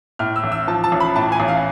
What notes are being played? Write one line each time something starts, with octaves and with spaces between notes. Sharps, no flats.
A2 F6
E6
A1
E6
F3 A5
A5
A1
B5
A2 A5
G#5
A1
F5